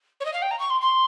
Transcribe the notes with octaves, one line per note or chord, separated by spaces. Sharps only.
C#5
D#5
F5
G5
A#5
C#6
C6
C6